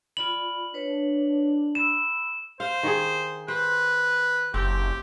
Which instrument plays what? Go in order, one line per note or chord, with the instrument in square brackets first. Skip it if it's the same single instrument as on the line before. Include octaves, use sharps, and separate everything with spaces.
[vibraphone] F4 D5 B5 [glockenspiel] F#7
[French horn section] D4 [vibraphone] B4 C#5
[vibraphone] B5 E6 [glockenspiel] E7
[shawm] C5 [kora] F5
[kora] D#3 G#4
[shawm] B4 [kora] C5
[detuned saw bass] F#1 [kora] C4 [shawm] G4